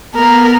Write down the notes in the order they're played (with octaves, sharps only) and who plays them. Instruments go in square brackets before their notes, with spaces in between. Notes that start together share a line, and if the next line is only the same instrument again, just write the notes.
[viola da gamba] B3 [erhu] A#4